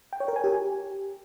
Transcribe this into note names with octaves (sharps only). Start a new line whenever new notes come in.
G5
C#5
A#4
G#5
G4